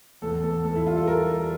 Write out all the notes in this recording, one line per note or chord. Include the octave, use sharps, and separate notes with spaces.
E2 A4
E2 A4
E2 A4
E4
G3 F4
A4
G3 A#4
G3